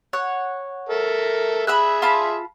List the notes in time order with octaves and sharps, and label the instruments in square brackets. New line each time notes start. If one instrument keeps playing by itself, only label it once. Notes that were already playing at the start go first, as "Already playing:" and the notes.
[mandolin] C#5 F#5
[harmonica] A4 A#4 E5
[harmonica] G#4 E5 [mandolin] B5 E6 F#6
[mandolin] F4 A5 B5